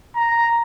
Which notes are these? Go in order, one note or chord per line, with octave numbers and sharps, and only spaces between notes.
A#5